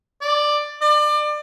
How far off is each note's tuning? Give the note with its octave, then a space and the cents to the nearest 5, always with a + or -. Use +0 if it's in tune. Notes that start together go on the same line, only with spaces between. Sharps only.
D5 +10
D5 +30